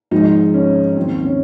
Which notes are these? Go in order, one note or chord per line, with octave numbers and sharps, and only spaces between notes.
G#1 G#2 F3 G#3 D#4
C#4
D#2 D#3 F#3 C4
C#4